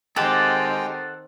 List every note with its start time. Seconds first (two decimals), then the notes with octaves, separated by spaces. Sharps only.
0.16 D#3 G#3 C4 G4 A4 F#5 G5 A5